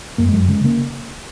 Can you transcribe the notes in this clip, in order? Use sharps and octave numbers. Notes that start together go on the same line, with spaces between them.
F#2 A#3
G#3
F#2 F#3
C#3 G#3
C#3 A#3